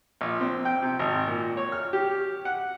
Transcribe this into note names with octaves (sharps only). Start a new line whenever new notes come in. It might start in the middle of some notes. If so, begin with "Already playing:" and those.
A#1
C4
G5
C3
G#1
A#2
C#5
F6
G4
F#5